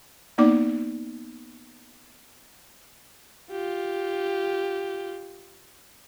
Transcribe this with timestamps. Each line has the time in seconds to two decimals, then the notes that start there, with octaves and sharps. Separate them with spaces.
0.38 A#3 B3 D#4 D5 D6
3.52 F4 G4